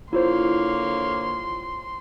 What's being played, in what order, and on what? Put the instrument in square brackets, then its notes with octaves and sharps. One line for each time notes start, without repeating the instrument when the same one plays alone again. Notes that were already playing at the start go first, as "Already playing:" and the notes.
[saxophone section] D3 A#3 C#5 [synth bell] E4 F4 C5 [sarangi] C6